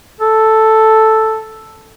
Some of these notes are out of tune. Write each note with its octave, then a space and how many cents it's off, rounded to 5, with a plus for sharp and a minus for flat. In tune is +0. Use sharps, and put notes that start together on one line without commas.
A4 +0